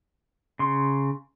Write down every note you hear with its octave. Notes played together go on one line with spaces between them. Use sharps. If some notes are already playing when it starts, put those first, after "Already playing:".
C#3 C6